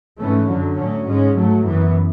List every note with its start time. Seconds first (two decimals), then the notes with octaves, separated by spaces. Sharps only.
0.19 G#2 E3 A3 C#4
0.48 F#2 D3 F#3
0.77 A2 F#3 C#4
1.05 G#2 G#3 C#4
1.35 G#2 F#3 A3
1.64 F#2 E3 B3